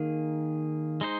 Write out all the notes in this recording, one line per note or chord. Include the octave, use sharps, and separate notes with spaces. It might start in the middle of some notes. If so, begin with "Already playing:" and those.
Already playing: D#3 A#3 G#4
G#3 D#4 C5